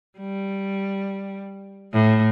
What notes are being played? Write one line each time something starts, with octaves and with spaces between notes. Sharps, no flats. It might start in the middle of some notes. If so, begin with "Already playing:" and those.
G3
A2